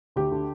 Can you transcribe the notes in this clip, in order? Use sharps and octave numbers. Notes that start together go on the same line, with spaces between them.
D2 G4
D3